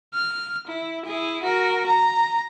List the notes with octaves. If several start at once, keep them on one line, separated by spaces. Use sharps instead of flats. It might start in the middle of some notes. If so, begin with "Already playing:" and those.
F6
E4
E4 G#4
F#4 A#4
A#5